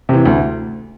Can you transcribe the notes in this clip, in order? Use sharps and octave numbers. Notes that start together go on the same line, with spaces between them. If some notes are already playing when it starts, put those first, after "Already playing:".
C3 E3
D2